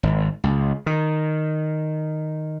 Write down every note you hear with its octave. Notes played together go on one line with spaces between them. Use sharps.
G#1
C#2
D#3